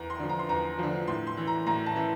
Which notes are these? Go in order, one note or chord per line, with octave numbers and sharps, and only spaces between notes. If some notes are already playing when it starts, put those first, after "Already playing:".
Already playing: E2 A#5
C6
D3 F3
A#5
C6
E2 A#5
D3 F3
A2 C6
C6
E3
A#5
A2 A#5
A5
E3